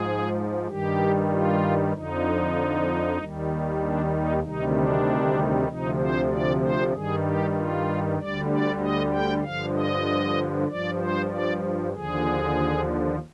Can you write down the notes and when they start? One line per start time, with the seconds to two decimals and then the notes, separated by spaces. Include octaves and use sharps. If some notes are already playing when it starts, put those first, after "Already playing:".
Already playing: G#2 F3 G#4
0.68 G2 D#3 G3 G4
1.31 F4
1.93 F2 D3 F3 D#4
3.18 D#2 D#3 G3
3.80 D4
4.12 D#4
4.42 D2 C3 D#3 G3 D#4
4.74 D4
5.68 D2 C3 F3 D#4
5.99 C5
6.31 D5
6.62 C5
6.93 G2 D#3 G3 G#4
7.25 G4
7.56 F4
8.18 D2 D3 G3 D5
8.50 D5
8.81 D#5
9.12 G5
9.43 G2 D3 F3 F5
9.74 D#5
10.68 G2 F3 D5
11.00 C5
11.31 D5
11.93 D#2 D3 F3 G#4